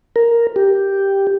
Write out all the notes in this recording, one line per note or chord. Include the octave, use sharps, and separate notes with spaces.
A#4
G4